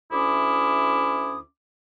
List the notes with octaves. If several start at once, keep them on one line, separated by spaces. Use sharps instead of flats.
D2 C#4 E4 D6 D#6